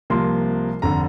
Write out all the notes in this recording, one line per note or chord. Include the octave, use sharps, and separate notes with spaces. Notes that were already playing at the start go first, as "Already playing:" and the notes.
C2 C3 F3 A#3 C6
F1 D3 A#5